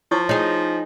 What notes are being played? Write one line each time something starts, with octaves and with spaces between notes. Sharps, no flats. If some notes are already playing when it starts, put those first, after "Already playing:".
F3 E4 C#5 C#6
D#4 G#4 C#5